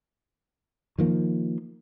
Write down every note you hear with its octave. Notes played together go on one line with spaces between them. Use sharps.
D#3 F3 A#3